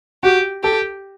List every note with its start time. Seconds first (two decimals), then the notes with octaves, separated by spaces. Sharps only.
0.23 F#4 G4
0.63 G4 A4